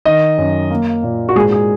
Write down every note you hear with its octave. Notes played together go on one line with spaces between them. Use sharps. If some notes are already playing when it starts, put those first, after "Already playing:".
D#3 D#5
F#2
A#3
A#2
F#4
G#2 G#4
G#4